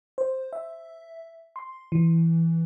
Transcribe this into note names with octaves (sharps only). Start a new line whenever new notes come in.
C5
E5
C6
E3